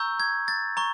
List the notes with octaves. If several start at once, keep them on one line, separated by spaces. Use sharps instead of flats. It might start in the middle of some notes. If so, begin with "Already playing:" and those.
Already playing: A#5 C#6 E6 G6
G#6
A6
A#5 C#6